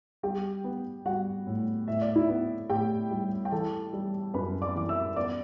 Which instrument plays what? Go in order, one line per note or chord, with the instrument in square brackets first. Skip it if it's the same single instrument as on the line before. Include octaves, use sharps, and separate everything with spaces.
[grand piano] G3 G4 G5
B3
G3 F#4 F#5
A2
A2 E5
D5
E4 E5
B3
A2 G4 G5
G3
G5
E3 A4 A5
G3
F#2 B4 B5
D5 D6
E3 D6
E5 E6
B3 D5 D6